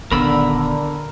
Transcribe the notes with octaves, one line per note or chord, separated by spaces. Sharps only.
D#1 D#2 D3 B3 A#4 B5 E6